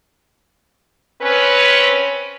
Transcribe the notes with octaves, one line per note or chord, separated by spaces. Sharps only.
C4 C#4 B4